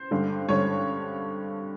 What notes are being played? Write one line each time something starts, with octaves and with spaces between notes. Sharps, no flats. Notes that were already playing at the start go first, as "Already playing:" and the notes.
Already playing: C5
G2 D3
G2 D3 C#5